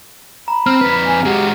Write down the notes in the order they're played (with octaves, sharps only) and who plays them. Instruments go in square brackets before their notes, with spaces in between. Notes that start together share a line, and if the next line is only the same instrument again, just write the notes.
[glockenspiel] A#5 [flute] B5
[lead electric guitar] C4 [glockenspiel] F6
[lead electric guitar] F2 B4
[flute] G#5
[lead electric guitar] G#3 F#4 [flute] G4